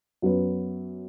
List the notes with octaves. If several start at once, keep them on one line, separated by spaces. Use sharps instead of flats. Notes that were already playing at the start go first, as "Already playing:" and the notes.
F#2 F#3 B3 F#4 B4